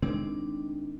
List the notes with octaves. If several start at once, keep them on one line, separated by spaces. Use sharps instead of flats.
D#3 G#3 C4 D4